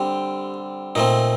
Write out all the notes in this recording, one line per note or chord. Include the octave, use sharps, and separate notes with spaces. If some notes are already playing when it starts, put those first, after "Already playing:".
Already playing: D3 G3 C4 G4
A#2 A3 C4 D#4